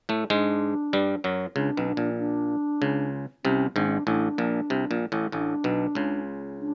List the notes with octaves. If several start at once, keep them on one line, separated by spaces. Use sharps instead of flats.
A2 A3
G#2 G#3 D4
G2 G3
F#2 F#3
C#2 C#3 D4
B1 B2 C#4
D4
A#1 A#2
D4
C#2 C#3
C2 C3 C#4
G#1 G#2 D4
C#4
D4
A1 A2 D4
A#1 A#2
C2 C3
A#1 A#2
A1 A2
A1 A2 D4
B1 B2
C#2 C#3
D4